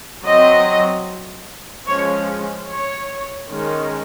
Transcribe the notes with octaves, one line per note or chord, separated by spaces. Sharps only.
F#3 C4 D#5
F3 G#3 C#4 C#5
C#5
D#3 G#3 C#4